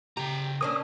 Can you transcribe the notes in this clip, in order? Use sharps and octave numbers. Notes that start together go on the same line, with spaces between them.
C#3 G4 A#5
A#3 C#4 D4 D#6